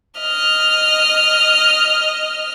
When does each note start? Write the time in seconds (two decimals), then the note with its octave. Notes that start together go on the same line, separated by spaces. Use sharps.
0.20 D#5 F6